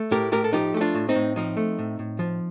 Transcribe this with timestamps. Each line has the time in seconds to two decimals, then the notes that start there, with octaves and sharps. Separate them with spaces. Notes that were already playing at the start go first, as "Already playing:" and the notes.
Already playing: A3
0.11 A2 G4 A#4
0.32 A2 G4 A#4
0.44 A4
0.53 F3 D#4 G4
0.74 A3 G4
0.81 D4 F4
0.95 A2
1.09 C4 D#4
1.15 A2
1.36 F3 C4 D#4
1.57 A3
1.79 A2
1.99 A2
2.19 F3